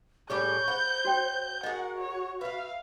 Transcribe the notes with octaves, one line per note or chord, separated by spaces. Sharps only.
A2 G3 C#4 G#4 B5 C#6 G6
C5 F#5 B5
F#4 C#5 G5
F#4 G#4 A#4 D#5 F#5
C#5
B4 E5 F5